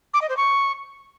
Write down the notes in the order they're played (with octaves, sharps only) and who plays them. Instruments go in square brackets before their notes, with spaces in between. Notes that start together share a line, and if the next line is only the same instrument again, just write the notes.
[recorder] D6
D#5
C5
C#6